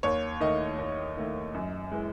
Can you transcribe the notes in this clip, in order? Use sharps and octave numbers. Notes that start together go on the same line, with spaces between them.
D#2 C#5
D#3 A3 D#5
D#2
D#3 A3
F#2
E3 G#3